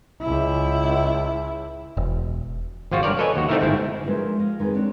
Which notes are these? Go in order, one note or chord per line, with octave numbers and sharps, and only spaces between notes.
C#2 E4
E1
G#1 F3 F4 F#4
G2 A#4 C#5 D5
A4 B4 C#5 D#5 G#5
D#2 F#4
A3 C4 D#4 E4 A#4 E5
G1 G#2 C4 E4
F3 G#3 A#3 B3 D4 E4
D#5 F5
F2 D#3 G#3 G#4 B4
C4 D4 C#5